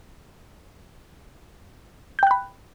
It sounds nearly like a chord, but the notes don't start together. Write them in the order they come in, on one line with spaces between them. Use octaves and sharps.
G6 G5 F#6 B5